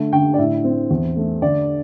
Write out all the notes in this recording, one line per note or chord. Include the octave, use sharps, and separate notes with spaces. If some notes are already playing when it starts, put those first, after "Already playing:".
Already playing: D3 A3
D3 G5
D5
A2 E5
C4
E2
A3
D3 D5